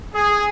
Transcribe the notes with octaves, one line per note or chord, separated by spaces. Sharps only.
G#4